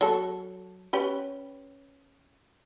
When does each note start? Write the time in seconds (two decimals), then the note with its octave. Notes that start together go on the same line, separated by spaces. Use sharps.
0.01 F#3 A4
0.93 C#4 G4 B4